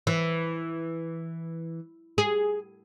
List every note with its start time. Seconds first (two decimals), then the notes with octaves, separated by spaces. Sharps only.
0.07 E3
2.18 G#4